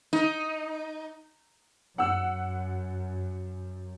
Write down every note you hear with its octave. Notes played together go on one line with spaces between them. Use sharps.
D#4
F#2 F#5 E6